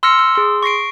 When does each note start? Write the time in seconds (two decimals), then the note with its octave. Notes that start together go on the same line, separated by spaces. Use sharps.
0.03 C6 E6 F6 A#6 C#7
0.19 E6
0.35 G#4 C6
0.63 C#6 A#6 C7 D7